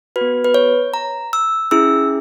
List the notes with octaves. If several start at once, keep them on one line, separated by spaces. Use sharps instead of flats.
F#4 B4
B3
B4
C#5
A#5
E6
C#4 E4 G#4 E6